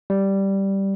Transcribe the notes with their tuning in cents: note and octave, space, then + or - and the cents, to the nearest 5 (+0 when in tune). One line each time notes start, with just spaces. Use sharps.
G3 -5